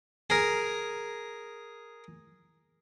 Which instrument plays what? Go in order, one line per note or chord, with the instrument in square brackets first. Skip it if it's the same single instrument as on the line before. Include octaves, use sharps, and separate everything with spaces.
[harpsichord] G#4 A#4